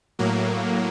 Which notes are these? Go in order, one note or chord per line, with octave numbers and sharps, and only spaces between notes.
A2 F#3 A#3